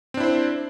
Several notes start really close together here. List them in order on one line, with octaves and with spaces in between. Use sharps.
C4 D4 E4 C5